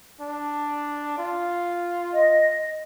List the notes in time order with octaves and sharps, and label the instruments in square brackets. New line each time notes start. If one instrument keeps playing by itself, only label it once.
[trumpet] D4
F4
[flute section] D#5